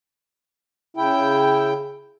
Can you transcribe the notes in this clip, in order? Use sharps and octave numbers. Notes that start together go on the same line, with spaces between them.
C#3 E4 G5